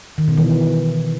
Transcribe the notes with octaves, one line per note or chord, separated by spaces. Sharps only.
D#3
B2
E3